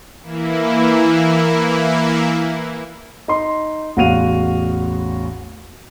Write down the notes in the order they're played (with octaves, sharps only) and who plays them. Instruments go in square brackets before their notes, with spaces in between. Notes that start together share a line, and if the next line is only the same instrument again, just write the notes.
[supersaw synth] E3 A#3 E4
[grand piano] D#4 C6
A1 E2 F#4 F5 D#7 F7